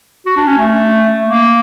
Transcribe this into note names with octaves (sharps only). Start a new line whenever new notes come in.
F#4
D4
C#4
A3
A#3